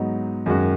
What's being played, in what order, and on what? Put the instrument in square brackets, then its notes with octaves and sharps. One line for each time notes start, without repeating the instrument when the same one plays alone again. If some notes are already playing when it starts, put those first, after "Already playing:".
Already playing: [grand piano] G#2 F#3 B3 D#4
F#2 D#3 G#3 C#4 F#4